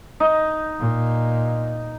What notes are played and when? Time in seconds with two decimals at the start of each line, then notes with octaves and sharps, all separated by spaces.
0.20 D#4
0.79 A#2